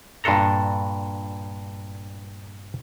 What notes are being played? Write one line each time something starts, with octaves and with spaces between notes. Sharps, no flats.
G2 A#2 D4 A4 A#5